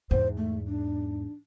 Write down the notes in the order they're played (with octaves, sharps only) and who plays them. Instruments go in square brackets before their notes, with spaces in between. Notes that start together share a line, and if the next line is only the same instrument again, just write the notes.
[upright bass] E2 G#2 [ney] C5
[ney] A3
D4